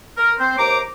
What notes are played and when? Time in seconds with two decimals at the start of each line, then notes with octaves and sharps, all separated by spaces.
0.17 A#4
0.39 C4 C5
0.58 D#2 C5 A#5 D6